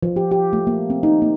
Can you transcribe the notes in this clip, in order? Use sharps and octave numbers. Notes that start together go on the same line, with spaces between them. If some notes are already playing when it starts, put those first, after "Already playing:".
F3
G4
G4
A3
A#3
C4
D#4
A#3